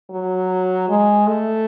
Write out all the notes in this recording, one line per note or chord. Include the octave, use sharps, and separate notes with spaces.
F#3
G#3
A3